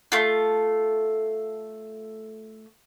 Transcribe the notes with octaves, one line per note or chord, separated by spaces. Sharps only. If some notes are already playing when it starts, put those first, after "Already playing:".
A3 F4